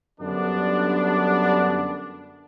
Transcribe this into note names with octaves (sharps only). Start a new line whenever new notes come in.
F#2 D3 G3 B3 D4